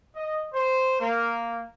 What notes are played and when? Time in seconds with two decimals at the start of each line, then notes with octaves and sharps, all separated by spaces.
0.14 D#5
0.53 C5
0.99 A#3